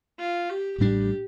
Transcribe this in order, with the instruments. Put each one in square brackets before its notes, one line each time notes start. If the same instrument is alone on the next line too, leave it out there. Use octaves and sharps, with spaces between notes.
[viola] F4
G4
[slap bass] A1 A2 G3 D4 [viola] G4